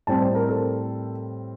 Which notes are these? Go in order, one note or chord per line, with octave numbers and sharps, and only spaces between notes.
A2 G3 C4 A5
C5
A#4
A4